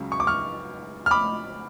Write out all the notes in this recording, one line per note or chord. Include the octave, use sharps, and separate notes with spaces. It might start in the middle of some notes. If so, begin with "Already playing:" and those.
Already playing: C#2 C#3 F#3 C#4
C#6
D6
C#6 F6
F6
B5 D6